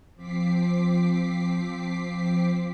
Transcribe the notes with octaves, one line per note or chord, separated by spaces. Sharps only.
F3 C4 D6 B6 C7